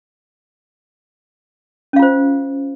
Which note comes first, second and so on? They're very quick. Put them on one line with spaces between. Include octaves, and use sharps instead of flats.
C#4 F5 F4 C5